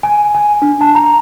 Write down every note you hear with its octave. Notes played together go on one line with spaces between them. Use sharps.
G#5
G#5
D4
A5
A#5